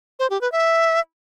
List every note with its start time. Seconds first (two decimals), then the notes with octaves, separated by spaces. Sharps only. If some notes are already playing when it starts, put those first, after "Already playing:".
0.19 C5
0.30 G4
0.41 B4
0.52 E5